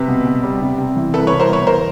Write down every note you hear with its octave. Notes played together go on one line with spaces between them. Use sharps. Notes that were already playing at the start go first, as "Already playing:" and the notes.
Already playing: C3 B4
B2
B2
G3
C3
C3
E3
C2 A4 B4
B4 C#5
C2
A#4 C5
B2 B4 C#5
E2 A#4 C5